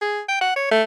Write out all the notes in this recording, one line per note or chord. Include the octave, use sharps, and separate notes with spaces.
G#4
G5
F#5
C#5
A3